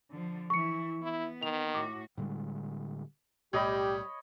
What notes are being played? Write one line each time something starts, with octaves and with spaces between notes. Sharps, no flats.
D3 F3
E3 E4 C#6 C#7
B3 E4
D#3 F7
A2 F#4 D6
A2 D3 G3 G#3
B1 A2 G3 G4 C#5 D#5 B5